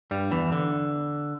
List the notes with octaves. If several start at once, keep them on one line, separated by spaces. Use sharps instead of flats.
G2 G3
E2 E3
D3